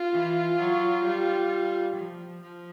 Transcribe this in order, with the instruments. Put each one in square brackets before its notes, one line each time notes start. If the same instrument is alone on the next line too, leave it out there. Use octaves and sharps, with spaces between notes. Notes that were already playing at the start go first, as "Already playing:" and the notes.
Already playing: [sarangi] F4
[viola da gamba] E3
F#3
G3
F3
F3